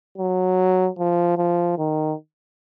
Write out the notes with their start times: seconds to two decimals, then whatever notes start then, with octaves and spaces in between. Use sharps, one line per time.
0.18 F#3
0.99 F3
1.38 F3
1.78 D#3